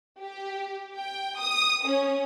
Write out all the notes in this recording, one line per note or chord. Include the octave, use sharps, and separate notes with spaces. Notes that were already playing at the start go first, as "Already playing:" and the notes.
G4
G5
D#6
C#4